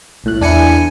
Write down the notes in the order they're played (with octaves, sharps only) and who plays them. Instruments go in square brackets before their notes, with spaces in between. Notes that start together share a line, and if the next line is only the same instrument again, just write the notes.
[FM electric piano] B1 A2 F#6
[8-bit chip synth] E2 G#5 C#7 [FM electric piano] D4 E4